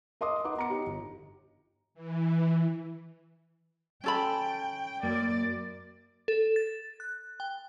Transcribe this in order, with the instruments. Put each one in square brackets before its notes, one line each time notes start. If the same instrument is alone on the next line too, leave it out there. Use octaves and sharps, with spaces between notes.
[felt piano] A#4 D#5 C6 D6 D#6
D#4 B4 F#5 D6
B3 A#5 C#7
D#4 G4
G1
[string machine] E3
[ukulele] C#4 A4 B5 [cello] G5
[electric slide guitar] F#2 A#3 [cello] D5
[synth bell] A4
A6
F#6
G5